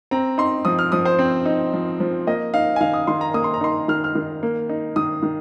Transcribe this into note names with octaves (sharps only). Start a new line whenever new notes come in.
C4 A#5
D#4 C6
F3 D#6
F6
F3 D#6
C5
C4
D#4
F3
F3
A#3 D#5
D#4 F5
G#5
D#3 F5
D#6
D#3 C6
A#5
A#3 D#6
C6
A#5
D#4 C6
D#3 F6
F6
D#3
A#3
D#4
D#3 D#6
D#3